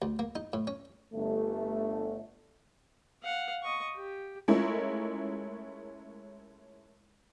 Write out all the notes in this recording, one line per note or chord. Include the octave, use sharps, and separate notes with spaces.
D2
A#3
D#4
A2
C#4
G1 A3
F5 F#5
D#5 C#6
G4
G#3 A3 C#4 E4 F4 A#4